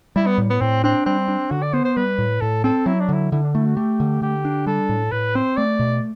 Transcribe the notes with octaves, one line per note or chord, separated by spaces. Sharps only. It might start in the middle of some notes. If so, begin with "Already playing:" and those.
G3 E4
B3
A2
B3
A2 C4
C4 D4
G3 C4
D4
D3 F#4
D5
B3 C5
C5
G3 B4
A2
A2 A4
C4 A4
F#3 E4
D4
D3 E4
D3 E4
D4
A3 E4
F#4
A3 G4
D3
D3 G4
D4
G3 A4
A2
A2 B4
C4 C5
A3 D5
B2